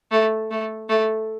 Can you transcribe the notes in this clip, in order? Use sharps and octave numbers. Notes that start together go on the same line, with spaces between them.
A3
A3
A3